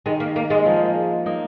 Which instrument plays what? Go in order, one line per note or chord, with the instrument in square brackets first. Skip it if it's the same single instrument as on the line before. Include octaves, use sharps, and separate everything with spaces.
[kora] D#3 [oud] G#3
[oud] A#3
A#3
G#3
[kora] F3 A#3
A#3 D#4